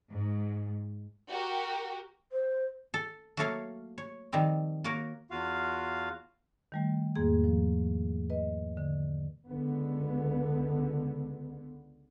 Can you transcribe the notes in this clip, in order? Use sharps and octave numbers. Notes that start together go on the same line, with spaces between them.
G#2
F#4 G4 A#4
C5
A4
F#3 A3 A#3 A4 C#5 F5
C#5
D#3 F3 G3 C4
A#3 F#4 A#4 C#5
E2 F4 F#4 F5
D#3 G3 A3
E2 G#2 A#3 G#4 G#6
F3
B4 D#5
D3
C#2 D3 B3